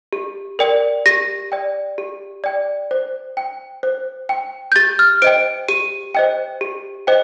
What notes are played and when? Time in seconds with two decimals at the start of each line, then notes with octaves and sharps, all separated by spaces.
0.13 G4
0.59 A#4 D5 G5
1.06 G4 A#6
1.52 D5 G5
1.98 G4
2.44 D5 G5
2.91 C5
3.37 G5
3.83 C5
4.29 G5
4.72 G6
4.76 G4 A6
4.99 F6
5.22 C5 D#5 G5 D7
5.69 G4 D#7
6.15 C5 D#5 G5
6.61 G4
7.07 C5 D#5 G5